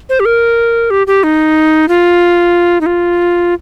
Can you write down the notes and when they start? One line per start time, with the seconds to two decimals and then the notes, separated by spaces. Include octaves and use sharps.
0.09 C5
0.20 G4
0.25 A#4
0.90 G4
1.07 G4
1.23 D#4
1.88 F4
2.81 D#4
2.86 F4